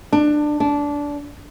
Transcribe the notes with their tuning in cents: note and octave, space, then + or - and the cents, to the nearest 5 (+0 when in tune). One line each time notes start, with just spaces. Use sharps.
D4 +20
D4 -15